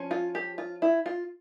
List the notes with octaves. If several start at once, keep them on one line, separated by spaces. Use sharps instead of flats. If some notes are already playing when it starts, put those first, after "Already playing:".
Already playing: F3 C#4
F4
G4
F4
E4
F4